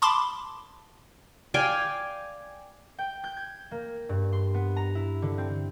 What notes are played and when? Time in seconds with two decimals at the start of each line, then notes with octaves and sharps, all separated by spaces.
0.02 A5 B5 C6 D6
1.54 D5 F5 G5 G#5
2.99 G5
3.24 G6
3.37 G#6
3.71 A#3
4.09 G2
4.33 C6
4.54 B3
4.76 A#5
4.95 E4
5.22 D3
5.38 C4